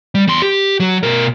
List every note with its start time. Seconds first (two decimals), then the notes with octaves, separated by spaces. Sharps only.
0.15 G3
0.27 E2 C6
0.42 G4
0.80 F#3
1.03 B2 A#4